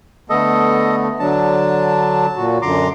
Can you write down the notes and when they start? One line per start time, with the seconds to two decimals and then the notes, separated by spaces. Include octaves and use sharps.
0.30 D3 A3 B3 A4 D#5
1.20 D3 F#3 D4 A5
2.36 A#2 F#4
2.62 F#2 D3 A#5 C6 D6